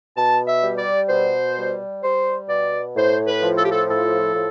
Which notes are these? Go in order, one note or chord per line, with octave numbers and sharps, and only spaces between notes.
B2 A5
E5
G3
D5
B2 C5
G3
G3 C5
B2 D5
A2 C5
B4
F3
A4
G4
A4
A2 A4
A2